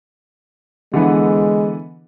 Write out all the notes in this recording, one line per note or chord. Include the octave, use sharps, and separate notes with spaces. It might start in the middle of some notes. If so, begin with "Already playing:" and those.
D3 E3 G#3 B3